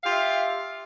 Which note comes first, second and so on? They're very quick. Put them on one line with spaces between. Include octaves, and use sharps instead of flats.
F5 G4 F4 E5